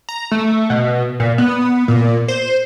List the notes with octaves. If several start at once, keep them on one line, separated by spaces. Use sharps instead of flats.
A#5
A3
B2
A#2
B3
A#2
C5